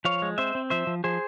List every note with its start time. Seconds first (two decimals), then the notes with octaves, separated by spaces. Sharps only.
0.05 F3 C#5 F5
0.22 G#3
0.38 C4 C5 E5
0.55 C4
0.70 F3 C5 E5
0.87 F3
1.04 F3 G#4 C5